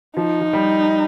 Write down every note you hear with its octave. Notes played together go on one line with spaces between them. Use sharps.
F3 D#4
F3
G3